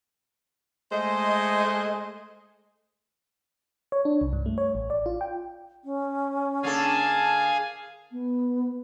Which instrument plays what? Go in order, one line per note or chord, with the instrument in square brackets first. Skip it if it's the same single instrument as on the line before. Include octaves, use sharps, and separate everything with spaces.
[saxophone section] G#3 A3 C5 D#5
[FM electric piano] C#5
D4
C2
G2
A3
C#5
A1
D5
F4
G5
[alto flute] C#4
[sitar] D3 A#3 A4 [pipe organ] G#4 F5 G#5 [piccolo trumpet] A5
[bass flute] B3